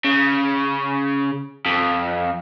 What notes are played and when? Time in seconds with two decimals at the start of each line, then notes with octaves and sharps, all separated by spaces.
0.04 C#3
1.66 F2